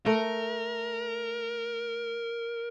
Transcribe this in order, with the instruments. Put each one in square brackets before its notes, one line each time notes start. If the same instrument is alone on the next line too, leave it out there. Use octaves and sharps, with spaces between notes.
[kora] A3 [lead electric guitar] A#4